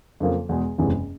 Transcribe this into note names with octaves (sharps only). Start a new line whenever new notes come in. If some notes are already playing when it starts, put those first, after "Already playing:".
F2 C#3 F3 A#3
E2 B2 G#3
F#1 E2 C3 E3 G#3